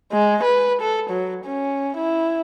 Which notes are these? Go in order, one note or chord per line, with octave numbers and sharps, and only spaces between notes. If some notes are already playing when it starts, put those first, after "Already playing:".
G#3
B4
A4
F#3
C#4
E4